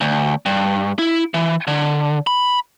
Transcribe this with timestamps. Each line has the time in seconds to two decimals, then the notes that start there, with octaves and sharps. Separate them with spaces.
0.01 D2
0.46 G2
0.99 E4
1.34 E3
1.67 D3
2.27 B5